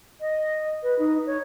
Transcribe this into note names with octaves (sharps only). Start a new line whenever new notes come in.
D#5
B4
D#4
C#5